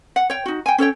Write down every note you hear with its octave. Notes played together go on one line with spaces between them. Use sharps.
F#5
C#5 G5
D#4 F#4
G5 G#5
C#4 A4 C#5 G5